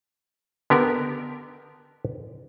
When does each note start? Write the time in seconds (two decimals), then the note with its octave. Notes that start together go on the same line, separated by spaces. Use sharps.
0.70 D3 B3 G4 A#4